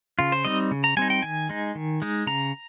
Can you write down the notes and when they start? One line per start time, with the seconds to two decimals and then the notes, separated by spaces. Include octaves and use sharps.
0.19 C#3 F4
0.32 C5
0.45 G3 C4 D#4 D#5
0.71 C#3
0.84 A#5
0.97 G3 C4 D#4 G#5
1.10 G5
1.22 D#3 G#5
1.49 G#3 D#4
1.75 D#3
2.02 G#3 D#4
2.27 C#3 A#5